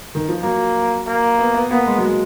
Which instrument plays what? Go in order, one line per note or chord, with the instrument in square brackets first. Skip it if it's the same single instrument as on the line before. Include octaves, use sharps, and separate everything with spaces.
[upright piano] D#3
F3
[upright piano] F#3 [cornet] A#3
[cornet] A#3
[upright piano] B3
B3
[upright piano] A#3 [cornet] B3
[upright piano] G#3
F#3
G#3